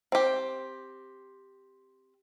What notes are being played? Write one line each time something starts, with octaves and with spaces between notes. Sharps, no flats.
C4 G4